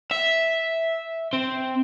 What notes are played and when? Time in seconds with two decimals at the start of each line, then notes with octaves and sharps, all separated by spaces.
0.11 E5
1.33 C4